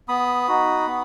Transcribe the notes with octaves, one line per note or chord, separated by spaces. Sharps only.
B3 B5 D#6
D#4 F#4
B3